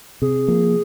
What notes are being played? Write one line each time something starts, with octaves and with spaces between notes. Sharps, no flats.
C3 G#4
F3 A#3